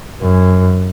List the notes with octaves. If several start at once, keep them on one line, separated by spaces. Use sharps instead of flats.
F#2